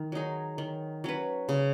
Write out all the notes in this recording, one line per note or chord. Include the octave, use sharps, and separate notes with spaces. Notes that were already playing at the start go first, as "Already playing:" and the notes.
Already playing: D#3
F#3 D#4 G#4
D#3
F#3 C#4 B4
C#3